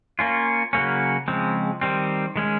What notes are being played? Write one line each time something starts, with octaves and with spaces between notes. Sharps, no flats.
A#3 C#4 F4
C#3 F#3 A#3 C#4
C#3 F3 G#3 C4
D#3 G3 C4
D#3 G#3 C#4